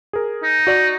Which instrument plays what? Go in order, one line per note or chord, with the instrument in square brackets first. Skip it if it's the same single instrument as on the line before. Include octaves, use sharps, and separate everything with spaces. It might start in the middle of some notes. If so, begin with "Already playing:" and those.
[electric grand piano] G#4 A#4
[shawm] D#4
[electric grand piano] F#4 D5